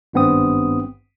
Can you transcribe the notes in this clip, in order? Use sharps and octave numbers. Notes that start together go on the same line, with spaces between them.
G#1 G2 B3 C4 D#6